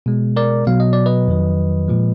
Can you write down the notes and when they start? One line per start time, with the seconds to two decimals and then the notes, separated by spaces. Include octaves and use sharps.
0.06 B2 G#3
0.36 A#4 D5
0.67 B2 F#3 F5
0.80 D#5
0.93 D5
1.06 B4 D#5
1.28 F2 D#3 F#3
1.88 A#2 F3 G#3